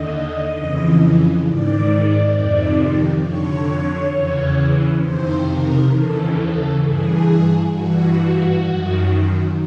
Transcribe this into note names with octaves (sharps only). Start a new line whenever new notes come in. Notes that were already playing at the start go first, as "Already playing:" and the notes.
Already playing: D#2 D3 D#5
F2 C#3 E3
G#2 D#3 D5
F2 C3 D#3
F2 D3 C#5
E2 C#3 E3
F2 C3 D#3 C5
A#4
D#2 C#3 E3 A4
A4
G2 E3 G#4
G2 E3 F#4
F#2 D#3